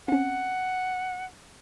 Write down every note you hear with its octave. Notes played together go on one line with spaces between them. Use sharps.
C4 C#4 F#5